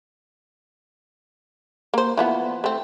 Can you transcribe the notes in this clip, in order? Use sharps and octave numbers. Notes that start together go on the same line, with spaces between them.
A#3 C5
E3 F3 B3
A3 C4